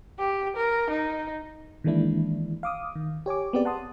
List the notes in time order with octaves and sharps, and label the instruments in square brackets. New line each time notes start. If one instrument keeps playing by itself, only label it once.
[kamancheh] G4
A#4
D#4
[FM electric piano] D#3 E3 G#3 A#3 D4 E4
F5 D6 D#6
D#3
G4 C#5 G#5 D6
B3 C4 G4 G#4 D5
F#5 A5 C6 D#6